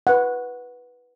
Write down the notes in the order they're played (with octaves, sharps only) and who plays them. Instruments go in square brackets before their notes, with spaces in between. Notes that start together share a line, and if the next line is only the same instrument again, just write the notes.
[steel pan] B4 F#5